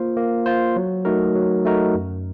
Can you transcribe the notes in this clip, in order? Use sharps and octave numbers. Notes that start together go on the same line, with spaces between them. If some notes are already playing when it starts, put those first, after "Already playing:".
Already playing: A#3 F4 C5
A#3
F4 C5
F#3
A3 D#4 F#4 A#4
F#3
A3 D#4 F#4 A#4
F#2